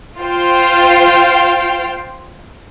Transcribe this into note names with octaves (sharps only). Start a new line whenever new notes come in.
F4 C5 F5 G5